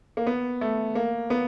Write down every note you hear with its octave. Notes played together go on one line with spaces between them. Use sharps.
A#3
B3
A3
A#3
B3